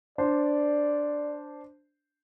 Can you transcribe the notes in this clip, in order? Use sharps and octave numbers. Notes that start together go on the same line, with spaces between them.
D4 C5 D5